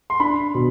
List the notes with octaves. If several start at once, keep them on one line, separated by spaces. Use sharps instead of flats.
C6
D4 B5
B2